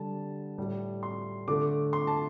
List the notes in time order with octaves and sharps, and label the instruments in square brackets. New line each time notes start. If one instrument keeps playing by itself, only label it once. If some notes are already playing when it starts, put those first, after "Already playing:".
Already playing: [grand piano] D3 G3 A5
A2 G3
C6
D3 A3 D6
C6
A5